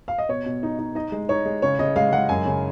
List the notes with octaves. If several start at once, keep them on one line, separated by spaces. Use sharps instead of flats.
F5
D#5
B2 C#5
B2
D#4
D#4
D#4 D#5
G#3
D#4 C#5
G#3
C#3 C#5
C#3 D#5
G#3 F5
G#3 F#5
F#2 G#5
C#3